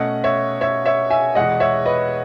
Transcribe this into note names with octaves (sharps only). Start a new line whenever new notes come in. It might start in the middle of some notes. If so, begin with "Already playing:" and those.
Already playing: B2 A3 C#4 D#5 F#5
C#5 E5
C#5 E5
C#5 E5
E5 G#5
E2 B2 G#3 D#5 F#5
C#5 E5
B4 D#5